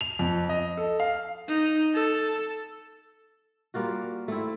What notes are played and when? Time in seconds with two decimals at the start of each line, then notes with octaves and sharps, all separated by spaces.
0.01 F7
0.19 F2
0.49 D#5
0.77 A4
1.00 F5
1.48 D#4
1.94 A4
3.74 G3 A#3 F4 F#4
4.28 A3 C4 E4